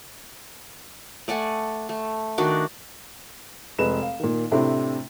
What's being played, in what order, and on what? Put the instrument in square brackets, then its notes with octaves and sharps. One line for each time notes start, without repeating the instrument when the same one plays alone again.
[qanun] A3 D5 F#5 G#5
A3
D#3 D4 F#4 D5
[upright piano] F1 G#3 B4 E7
F5
A#2 D#3
A2 C3 A3 C4 D4 E4